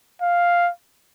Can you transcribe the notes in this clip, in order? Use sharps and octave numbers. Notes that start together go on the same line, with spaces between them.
F5